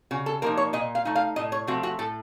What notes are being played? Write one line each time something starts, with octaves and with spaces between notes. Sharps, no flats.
C#3 F#4
A4
F3 A#3 D#4 A#4
C#5
A#2 D#5
F5
A3 D#4
F5
A2 D#5
C#5
F3 A3 C4 F#4
F#4
A2 A4